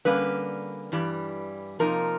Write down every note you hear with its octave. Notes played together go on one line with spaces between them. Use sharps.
D3 G3 A#3 C#4 B4
G2 E3 G3
C3 F3 A#3 D#4 A#4